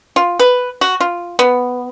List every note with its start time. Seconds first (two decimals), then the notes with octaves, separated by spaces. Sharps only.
0.16 F4
0.39 B4
0.81 F#4
1.00 F4
1.39 B3